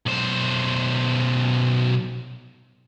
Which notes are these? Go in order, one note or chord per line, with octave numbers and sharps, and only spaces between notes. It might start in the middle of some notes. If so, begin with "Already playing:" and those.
B1 C5